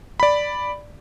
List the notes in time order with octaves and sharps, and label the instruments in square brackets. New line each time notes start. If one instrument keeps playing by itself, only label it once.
[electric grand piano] D5 B5